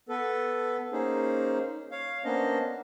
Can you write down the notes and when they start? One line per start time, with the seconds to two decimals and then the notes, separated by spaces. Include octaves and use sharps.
0.09 B3 A4 B4
0.92 A#3 C#4 D#4 G#4 C5
1.91 C#5 F5
2.24 A#3 B3 C#4 D4 C5 D#5